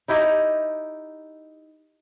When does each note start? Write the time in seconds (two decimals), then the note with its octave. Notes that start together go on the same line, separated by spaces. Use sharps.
0.08 D#4 E4 G4 D#5